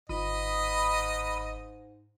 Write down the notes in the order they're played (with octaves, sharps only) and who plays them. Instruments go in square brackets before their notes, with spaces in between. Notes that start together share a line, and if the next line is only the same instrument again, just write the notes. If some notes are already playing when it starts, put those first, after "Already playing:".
[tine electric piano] G1 [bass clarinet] G#2 [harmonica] D#5 [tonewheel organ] B5 D#6